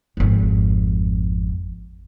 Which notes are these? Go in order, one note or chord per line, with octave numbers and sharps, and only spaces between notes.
G#1 F2